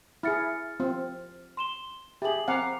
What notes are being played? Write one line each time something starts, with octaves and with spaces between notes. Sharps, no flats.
E4 G#4 F6 A6 C#7
C4 F4
C6 E7 G7
G4 G#4 E5 F#7
C4 F5 F#5 G#5 A#5 D6